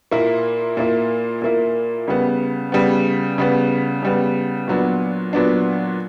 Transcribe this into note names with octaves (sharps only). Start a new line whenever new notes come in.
A#2 A#3 E4
A#2 A#3 E4
A#2 A#3 E4
C#3 G3 B3
C#3 G3 B3
C#3 G3 B3
C#3 G3 B3
A#2 F#3 B3 D4
A#2 F#3 B3 D4